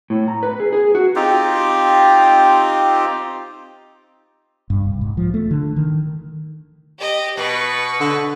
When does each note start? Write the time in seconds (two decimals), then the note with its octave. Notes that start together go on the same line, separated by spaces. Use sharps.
0.10 A2
0.28 A#5
0.43 B4
0.60 G#4
0.73 G#4
0.95 F#4
1.15 C4 D#4 F4 G4
4.70 G2
4.86 C2
5.01 G#2
5.17 F3
5.34 A3
5.51 D3
5.76 D#3
6.99 G4 D#5
7.37 B2 B4 C#6
8.00 D3